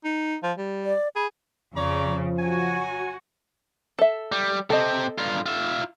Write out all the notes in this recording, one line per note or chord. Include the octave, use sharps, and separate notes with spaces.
D#4
F3
G3
D5
G#4 B5
F2 C#3 C#5 D5 A#5
F3
F#3 F#4 G#5
A4 E5
G3
C3 C4 A4 D#5
G2 F4
F4 E5